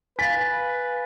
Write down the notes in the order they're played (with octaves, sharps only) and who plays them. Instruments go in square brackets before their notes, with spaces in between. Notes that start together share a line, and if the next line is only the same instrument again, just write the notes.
[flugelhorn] B4 [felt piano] F5 B6 [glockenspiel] G#5 A6